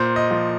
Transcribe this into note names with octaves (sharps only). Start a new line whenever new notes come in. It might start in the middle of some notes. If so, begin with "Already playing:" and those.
Already playing: A#2 C5
D#5
F3